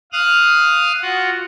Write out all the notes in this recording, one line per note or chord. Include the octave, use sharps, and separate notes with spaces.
F5 D#6 F6 F#6
F4 F#4 F#5